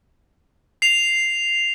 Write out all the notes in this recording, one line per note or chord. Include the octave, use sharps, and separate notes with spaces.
C7 F7